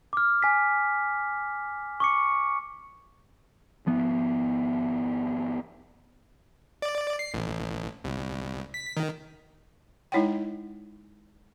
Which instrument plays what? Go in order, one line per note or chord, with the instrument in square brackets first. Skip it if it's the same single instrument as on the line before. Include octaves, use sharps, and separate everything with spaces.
[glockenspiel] D6 F6
G#5 B6
C#6 D6 C#7
[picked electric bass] G#1 F3 B3
[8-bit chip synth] D5
C7
A1
C2
B6
D#3
[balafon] G#3 D#4 E4 C#5 F#5 G5